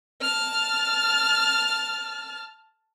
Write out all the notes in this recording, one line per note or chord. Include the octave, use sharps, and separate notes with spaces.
A5 F6